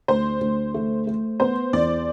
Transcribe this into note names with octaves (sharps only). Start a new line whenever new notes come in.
D2 C5
D2
A3
A3
B3 C5
E2 D5